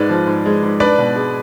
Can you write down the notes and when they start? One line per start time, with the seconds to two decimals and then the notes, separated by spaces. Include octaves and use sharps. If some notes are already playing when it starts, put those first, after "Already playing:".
Already playing: G#2 G#3 B4 D5
0.09 F3
0.27 G#2
0.46 G#3
0.63 G#2
0.80 D4 B4 D5
0.98 B2
1.16 G#3